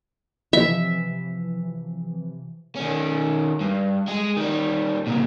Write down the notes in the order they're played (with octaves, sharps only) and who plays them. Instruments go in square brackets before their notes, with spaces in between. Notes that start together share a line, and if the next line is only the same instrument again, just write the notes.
[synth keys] C3 E3 F3 [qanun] E5
[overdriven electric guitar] D#3 C#4
G2
G#3 G#4
D#3 G3
A#2 C#3